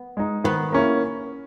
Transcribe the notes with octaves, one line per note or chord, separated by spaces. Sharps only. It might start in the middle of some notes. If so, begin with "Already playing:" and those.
Already playing: B3
G#3 D#4
D#3 B3
A#3 C#4 E4